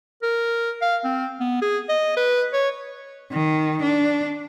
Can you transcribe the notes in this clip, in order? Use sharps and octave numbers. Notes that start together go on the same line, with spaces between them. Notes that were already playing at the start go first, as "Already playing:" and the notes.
A#4
F5
C4
B3
G#4
D#5
B4
C#5
D#3
D4